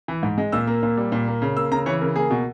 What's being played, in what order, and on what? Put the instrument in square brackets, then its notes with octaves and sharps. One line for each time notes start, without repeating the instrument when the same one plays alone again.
[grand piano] E3
G#2
G#3
A#2 E6
A#3
A#2
G3
A#2
A#3
C#3
A#3 E6
C#3 A#5
E3 C#5
C#3 A#4
A#3 G#4
B2